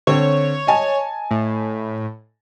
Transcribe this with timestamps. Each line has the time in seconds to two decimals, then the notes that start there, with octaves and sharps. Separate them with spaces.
0.07 D3 C4 C#5
0.67 D#5 G#5 A5
1.31 A2